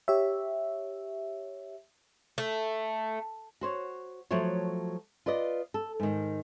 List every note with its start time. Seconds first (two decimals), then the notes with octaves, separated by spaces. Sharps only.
0.08 G4 C#5 E5
2.38 A3
3.61 F#4 C5 C#5
4.31 F3 F#3 A3 F#4 C#5
5.26 F4 B4 D5 D#5
5.74 A4
6.00 G#2 D#3